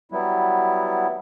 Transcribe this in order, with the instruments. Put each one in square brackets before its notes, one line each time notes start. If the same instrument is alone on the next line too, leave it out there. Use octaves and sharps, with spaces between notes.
[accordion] F#3 G3 B3 E4